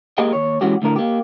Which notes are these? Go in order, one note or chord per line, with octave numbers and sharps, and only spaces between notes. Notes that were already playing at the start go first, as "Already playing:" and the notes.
A#3 G4 G#4 A#4 D#5 G5
D#2 C#5
E3 G#3 C#4 F#4 G4
D2 A2 D3 A#4
A#3 G4